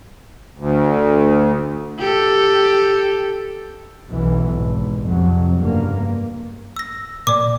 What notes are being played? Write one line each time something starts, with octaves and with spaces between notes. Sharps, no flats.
D2
G4 A4
F#1 B1 B2 E3
G#1
F2 C3 F#3
F#1 G2 A#3
E6 A#6
A#2 D5 D6